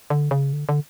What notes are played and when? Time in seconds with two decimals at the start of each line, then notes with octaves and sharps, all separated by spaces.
0.10 D3
0.31 C#3
0.53 D3
0.69 D3